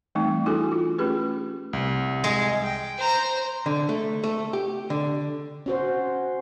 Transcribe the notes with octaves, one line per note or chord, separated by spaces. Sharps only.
E3 G3 A3 C4 D#4
D4 E4 F#4 G#4 A4 G#5
F4
A3 C#4 G4 G#4 B4
C2
G#3
G5
C5 A#5
D3
A3
A3
G4
D3
C#4 F#4 C5